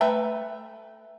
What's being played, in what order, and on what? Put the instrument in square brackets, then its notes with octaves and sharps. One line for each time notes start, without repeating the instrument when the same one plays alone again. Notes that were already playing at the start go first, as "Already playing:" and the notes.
[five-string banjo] A3 B4 E5 G5 A#5